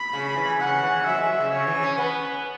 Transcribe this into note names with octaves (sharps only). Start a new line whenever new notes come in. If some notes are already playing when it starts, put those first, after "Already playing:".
Already playing: B5
C#3
E3
C#3 F#5
E3
F#3 E5
G#3
F#3
C#3
C#3 C#5
E3
C#4
B3 B4